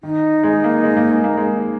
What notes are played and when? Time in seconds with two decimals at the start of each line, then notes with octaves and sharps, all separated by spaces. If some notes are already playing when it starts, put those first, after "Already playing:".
0.03 D#3 D#4
0.43 G#3
0.64 A#3
0.84 G#3
0.97 A#3
1.10 G#3
1.24 A#3
1.37 G#3